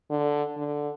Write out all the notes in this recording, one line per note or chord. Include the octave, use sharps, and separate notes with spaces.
D3
D3